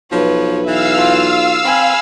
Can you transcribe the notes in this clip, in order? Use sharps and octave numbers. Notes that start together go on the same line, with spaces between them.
B1 F3 B4 C#5
E3 E5 F5 E6
F4
C4 G#5 B5